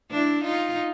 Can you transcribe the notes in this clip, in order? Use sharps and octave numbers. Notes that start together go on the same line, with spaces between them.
D4 E4
D#4 F4